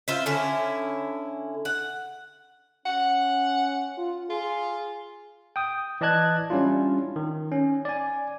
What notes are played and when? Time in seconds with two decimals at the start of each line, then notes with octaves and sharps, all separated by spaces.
0.08 F4 C5 E5
0.26 D3 C#4 E4
1.65 F#5
2.86 C#4 F#5
3.98 F4
4.30 F4 G#4
5.56 G5 D#6
6.01 E3 D5 D#5 A5 F#6 G#6
6.50 G3 C#4 D4 E4 F4
7.16 D#3
7.51 C#4
7.85 D5 G#5